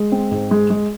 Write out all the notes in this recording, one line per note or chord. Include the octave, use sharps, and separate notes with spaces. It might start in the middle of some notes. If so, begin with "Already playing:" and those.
Already playing: G#3
C4
G#2
G#3
G#3